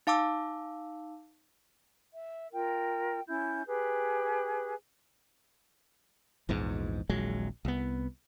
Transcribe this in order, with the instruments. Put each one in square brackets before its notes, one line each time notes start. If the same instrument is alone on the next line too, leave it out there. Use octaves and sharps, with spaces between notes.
[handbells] D#4 F5 A5 D6 E6
[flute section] E5
F4 A#4 G5
C#4 E4 E5 G6
G4 G#4 B4
[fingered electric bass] A#1 E2 G#2
D#1 A#1 F#3 G#3
C2 B3